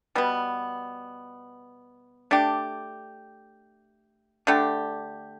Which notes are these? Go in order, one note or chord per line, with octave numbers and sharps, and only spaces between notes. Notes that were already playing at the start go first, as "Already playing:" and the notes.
B2 G3 B3
A3 D4 G4
D3 A3 D4 G4